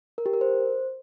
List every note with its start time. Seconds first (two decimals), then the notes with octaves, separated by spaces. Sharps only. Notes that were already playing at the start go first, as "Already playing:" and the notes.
0.18 A#4
0.26 G4
0.33 A#4
0.41 C5